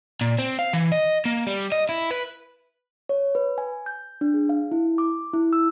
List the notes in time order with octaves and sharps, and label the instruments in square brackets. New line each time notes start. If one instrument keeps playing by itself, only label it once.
[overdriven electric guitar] A#2
C4
F5
E3
D#5
A#3
G3
D#5
E4
B4
[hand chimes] C#5
B4
G#5
G6
D4
G#4
F5
E4
D6
E4
E6